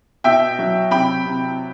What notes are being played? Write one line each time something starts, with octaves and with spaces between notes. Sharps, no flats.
B2 E5 G5
F#3
C3 G5 B5
C3